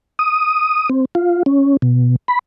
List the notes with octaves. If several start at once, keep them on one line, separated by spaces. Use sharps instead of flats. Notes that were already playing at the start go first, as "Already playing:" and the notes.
D#6
C4
F4
C#4
B2
B5